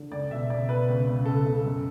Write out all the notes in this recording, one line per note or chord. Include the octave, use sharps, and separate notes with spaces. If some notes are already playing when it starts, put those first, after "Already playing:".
Already playing: D3
C#2 D5
B2 E5
B2 D5
B2 B4
C#2
C#3
C#2 A4
C#3
F#2